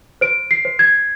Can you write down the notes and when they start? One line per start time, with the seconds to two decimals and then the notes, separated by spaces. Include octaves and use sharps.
0.21 C5 D7
0.51 C7
0.65 C5
0.79 G#6